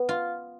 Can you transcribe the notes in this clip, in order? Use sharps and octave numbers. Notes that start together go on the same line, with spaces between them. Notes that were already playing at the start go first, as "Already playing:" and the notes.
Already playing: B3
F4